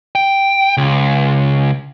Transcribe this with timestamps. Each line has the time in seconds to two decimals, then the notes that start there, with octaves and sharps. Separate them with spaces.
0.15 G5
0.77 C#2